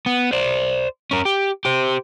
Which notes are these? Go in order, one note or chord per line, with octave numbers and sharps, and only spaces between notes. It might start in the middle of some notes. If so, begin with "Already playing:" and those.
B3
C5 D5
C#4 A#4
G4
G4 C5